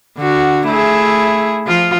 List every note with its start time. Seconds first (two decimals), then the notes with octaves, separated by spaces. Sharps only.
0.17 D3 F#4
0.67 A3 E4 G#4
1.66 F3 F4